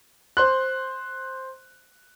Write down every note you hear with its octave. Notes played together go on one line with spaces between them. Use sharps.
C5 C6 F#6